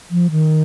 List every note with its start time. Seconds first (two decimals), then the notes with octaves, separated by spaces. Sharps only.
0.11 F3
0.31 D#3